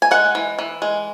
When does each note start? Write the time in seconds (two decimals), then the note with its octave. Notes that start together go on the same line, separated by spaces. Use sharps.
0.02 G#5
0.11 G#3 F#5
0.35 E3
0.59 E3
0.82 G#3